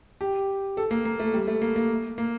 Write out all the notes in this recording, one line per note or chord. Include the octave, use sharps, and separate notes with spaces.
G4
A4
A#3
A#3
A3
G3
A3
A#3
A#3
A#3